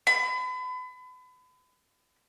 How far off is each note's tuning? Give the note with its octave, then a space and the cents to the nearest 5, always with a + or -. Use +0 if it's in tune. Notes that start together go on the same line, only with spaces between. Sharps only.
B5 +35